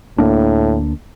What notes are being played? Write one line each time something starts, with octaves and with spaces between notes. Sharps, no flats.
D2 A2 A#3 D4